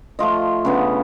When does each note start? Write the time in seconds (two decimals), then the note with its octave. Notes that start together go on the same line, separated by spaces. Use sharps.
0.19 F3 A3 F4 D#5
0.65 C#3 B3 D4